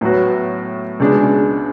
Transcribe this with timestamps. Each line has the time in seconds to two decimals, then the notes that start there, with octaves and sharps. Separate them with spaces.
0.01 A2 F#3 B3 F#4
1.00 C#2 B2 G#3 D4 G#4